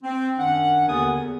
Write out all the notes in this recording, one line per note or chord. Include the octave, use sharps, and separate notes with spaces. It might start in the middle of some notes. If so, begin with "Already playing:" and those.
C4
F#2 D#3 C#4 D4 F#5
D#2 D3 B3 A#4 G#5 D#6
E2